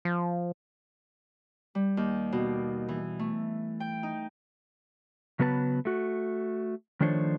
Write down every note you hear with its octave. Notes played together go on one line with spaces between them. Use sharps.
F3
G3
D#2
B2
E3
A3
G5
D#4
C#3 F#3 B3 B4 C#5 A5
A3 F#4
D#3 F3 A3 D4 C5 C#5